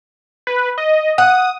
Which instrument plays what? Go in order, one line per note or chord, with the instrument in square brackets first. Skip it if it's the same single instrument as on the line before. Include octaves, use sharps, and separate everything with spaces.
[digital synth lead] B4
D#5
[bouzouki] F#5 [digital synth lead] D#6